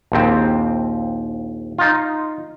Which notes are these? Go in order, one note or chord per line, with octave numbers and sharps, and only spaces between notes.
A#1 D#2 C4
D#4 F4